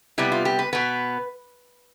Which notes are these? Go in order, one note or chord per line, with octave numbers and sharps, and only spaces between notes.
C3 G3 B3 E4
F4
G4
B4
B2 B3 B4